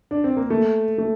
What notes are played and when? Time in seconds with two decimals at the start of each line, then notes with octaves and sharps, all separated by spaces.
0.11 D4
0.24 C4
0.37 A#3
0.50 A3
0.98 A3